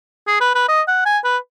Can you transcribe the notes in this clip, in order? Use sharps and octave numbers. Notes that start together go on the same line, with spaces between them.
G#4
B4
B4
D#5
F#5
G#5
B4